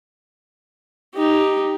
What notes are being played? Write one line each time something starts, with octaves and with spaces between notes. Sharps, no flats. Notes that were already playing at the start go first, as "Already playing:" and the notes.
D#4 G4